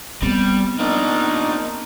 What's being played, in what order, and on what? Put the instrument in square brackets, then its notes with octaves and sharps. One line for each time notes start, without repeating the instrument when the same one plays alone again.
[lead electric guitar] G3 [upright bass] B3 C4
[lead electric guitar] A#3 D4 [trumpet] D#4